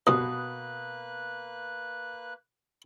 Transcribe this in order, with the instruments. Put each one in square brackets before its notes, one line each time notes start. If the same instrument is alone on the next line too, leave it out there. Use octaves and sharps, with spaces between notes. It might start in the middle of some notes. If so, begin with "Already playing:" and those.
[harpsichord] C2 G2 [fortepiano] B2 [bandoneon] A#3 B4 F#6 [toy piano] D#6